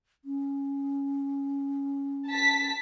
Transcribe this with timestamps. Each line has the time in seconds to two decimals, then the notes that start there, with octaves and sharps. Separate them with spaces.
0.25 C#4
2.29 A5 B6